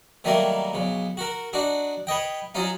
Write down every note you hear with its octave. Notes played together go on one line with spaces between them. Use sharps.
D#3 F#3 G3 A3 A#3 A#4
B1 C#3
F#4 A#4
D4 D#4 F#4
B4 C#5 D#5 G5
F#3 C#4 D#4 F4